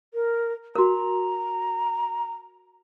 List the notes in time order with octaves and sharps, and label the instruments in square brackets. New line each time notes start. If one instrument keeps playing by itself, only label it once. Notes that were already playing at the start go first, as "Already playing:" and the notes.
[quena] A#4
[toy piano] F#4 A#4 [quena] A#5